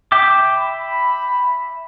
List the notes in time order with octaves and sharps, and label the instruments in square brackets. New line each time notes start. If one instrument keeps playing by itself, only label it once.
[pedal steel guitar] E5 G5 D6
[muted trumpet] B5